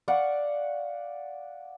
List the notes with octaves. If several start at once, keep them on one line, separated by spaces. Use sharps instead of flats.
D5 F5 F#5 C#6